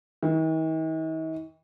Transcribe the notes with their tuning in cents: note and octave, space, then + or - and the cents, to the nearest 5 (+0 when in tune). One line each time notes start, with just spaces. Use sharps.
D#3 +45